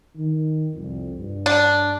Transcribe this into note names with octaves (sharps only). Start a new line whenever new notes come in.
D#3
C2 F2
G2
D4